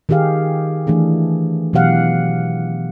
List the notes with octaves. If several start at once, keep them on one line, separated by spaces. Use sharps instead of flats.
D#3 D#4 G4 G#4 F5
E3 A3 D4 G#4
B2 E3 F#3 G4 F5 F#5